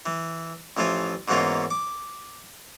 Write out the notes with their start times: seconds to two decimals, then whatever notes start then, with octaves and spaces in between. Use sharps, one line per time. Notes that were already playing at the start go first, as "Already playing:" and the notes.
0.06 E3
0.77 A1 E3 F3 F4 G#5
1.28 G#2 B2 E3 A#3 C#4 F4
1.70 D6